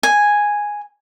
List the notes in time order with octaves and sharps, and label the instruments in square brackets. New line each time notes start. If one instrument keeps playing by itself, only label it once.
[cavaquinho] G#5